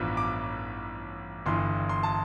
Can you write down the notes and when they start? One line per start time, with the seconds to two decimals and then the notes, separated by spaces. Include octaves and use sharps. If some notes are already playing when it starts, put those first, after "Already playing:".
Already playing: A1 G2 F3 B3
0.17 D6
1.46 G1 G2 E3 C6
1.89 C6
2.03 A5